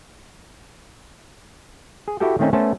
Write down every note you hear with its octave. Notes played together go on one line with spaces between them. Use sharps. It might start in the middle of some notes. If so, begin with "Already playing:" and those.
G#4
E4 F#4 G4 A4 G5
D#3 A3 C4 C#4 D#4
A3 B3 C#4 A4 C5 A5